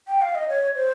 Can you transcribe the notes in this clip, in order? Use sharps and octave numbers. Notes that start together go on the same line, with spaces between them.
G5
F5
D#5
C#5
C5